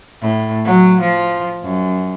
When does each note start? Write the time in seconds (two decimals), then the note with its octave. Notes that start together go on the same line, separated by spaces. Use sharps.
0.22 A2
0.65 F#3
1.01 F3
1.63 F#2